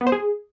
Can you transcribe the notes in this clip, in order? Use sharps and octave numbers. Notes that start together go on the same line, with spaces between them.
B3
C5
G#4